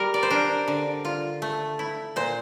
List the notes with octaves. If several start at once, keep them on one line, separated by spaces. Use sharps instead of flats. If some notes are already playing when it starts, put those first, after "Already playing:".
Already playing: G3 A#4
D5
C5
D4 A#4
D3
F4
A3
E4
A#2 C5